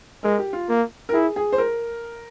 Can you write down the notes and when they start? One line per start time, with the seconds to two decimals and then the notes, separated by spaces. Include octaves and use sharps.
0.23 G#3 A#4
0.39 G4
0.53 F4
0.69 A#3
1.09 A#4
1.13 E4 G#4
1.36 G#4
1.52 C5
1.58 A#4